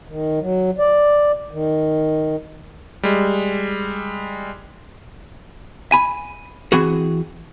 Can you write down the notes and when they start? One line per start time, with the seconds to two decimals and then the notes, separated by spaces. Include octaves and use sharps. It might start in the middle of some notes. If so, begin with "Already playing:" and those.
0.08 D#3
0.40 F#3
0.79 D5
1.52 D#3
3.03 G3 G#3
5.92 G#5 B5
6.72 E3 C4 F#4 G#4